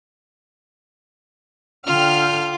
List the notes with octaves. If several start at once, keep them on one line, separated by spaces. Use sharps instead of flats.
D3 F4 G5 F6